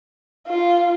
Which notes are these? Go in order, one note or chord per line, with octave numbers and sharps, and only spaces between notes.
F4